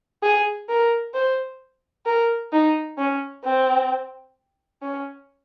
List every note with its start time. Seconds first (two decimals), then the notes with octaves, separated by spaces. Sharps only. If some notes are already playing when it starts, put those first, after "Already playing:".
0.23 G#4
0.69 A#4
1.14 C5
2.06 A#4
2.53 D#4
2.98 C#4
3.44 C4
4.82 C#4